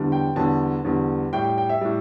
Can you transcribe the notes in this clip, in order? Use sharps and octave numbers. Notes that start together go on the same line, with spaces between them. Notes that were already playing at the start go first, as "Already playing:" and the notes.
Already playing: E2 D3 G3
G5
E2 D3 G3 A5
E2 D3 G3
A2 G3 G5
G5
G5
E5
A2 G3